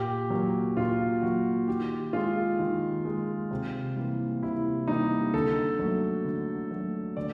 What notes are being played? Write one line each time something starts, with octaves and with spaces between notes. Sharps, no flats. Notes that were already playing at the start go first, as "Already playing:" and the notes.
Already playing: A#2 G4
F#3 A#3
A#2 F4
F#3 A#3 F#4
D#3 G4
G#3 F4
D#3
G#3
C3
E3 G3 A#3
C3 E4
E3 G3 A#3 D#4
D3 A4
F#3 A3
D3
F#3 A3
D3 D5